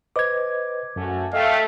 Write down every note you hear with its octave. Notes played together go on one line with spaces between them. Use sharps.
B4 C5 D#5 D6 G#6
F#2 A3 C#4 F#4
A3 D#5 F5 G5